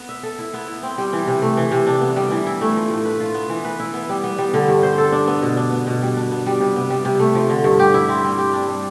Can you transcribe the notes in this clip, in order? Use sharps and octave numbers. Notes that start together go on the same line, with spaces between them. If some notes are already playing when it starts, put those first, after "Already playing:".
Already playing: B3
E5
A4
E4
B3
E4
C4
G3
E3
C3
A3
E3
C3
D4
B3
G3
E3
E4
A3
F3
A2
B4
F4
B3
E3
B4
E4
B3
G3
B3
G3
D3
G2
C5
A4
D4
B3
B2
D4
B3
B2
G3
D4
B3
G3
C3
B3
G3
C3
A3
F3
D3
G2
G4
E4
C4
G3
G4
D4
G3